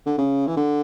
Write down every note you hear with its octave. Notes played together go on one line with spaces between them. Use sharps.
D3
C#3
E3
D3